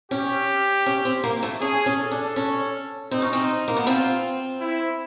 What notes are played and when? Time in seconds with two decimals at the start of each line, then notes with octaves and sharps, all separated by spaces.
0.11 C#4 G4
0.86 C#4
1.05 C4
1.24 A#3
1.43 A3
1.61 C#4 G#4
1.86 C#4
1.99 A4
2.11 D4
2.36 C#4
3.11 C4 D#4
3.22 C#4
3.33 C4
3.68 A#3
3.77 B3
3.87 C4 F4
4.61 E4